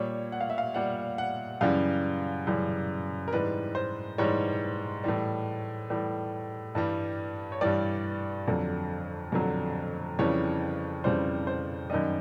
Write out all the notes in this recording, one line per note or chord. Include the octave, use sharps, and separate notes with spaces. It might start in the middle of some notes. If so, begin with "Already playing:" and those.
Already playing: A#2 G3 C#5
F#5
F5
E5
F5
A#2 G3 F#5
F#5
F#2 C#3 E3 G3 F5
F#2 C#3 E3 G3
A#4
G#2 E3 G3 B4
C5
G#2 E3 G3 C#5
A2 E3 G3
A2 E3 G3
G2 E3 G3
C#5
G2 E3 G3 D5
F2 D3 F#3
F2 D3 F#3
F2 C#3 E3 G3 C#5
F2 C#3 E3 G3 C5
C5
F#2 D#3 G3 D#5